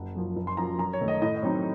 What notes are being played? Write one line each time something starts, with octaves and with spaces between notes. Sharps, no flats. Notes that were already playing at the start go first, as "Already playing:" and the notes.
Already playing: F#1 F#5
F#2 F3
F#1
C6
F#2 F3 A#5
F#2 A#5
C#5
D#3 A3
D#5
A2 D#5
D#5
F#3 C4 D#4 C#5